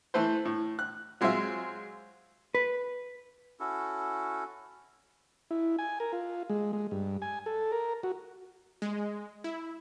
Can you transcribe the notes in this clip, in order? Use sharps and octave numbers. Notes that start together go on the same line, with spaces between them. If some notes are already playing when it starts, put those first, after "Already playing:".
E3 A3 B4 C5
A2
F#6
F#3 G#3 C4 F4 E5
B4
C#4 E4 F#4 A4
E4
G#5
A#4
F4
G#3
G#3
G2
G#5
A4
A#4
F#4
G#3
E4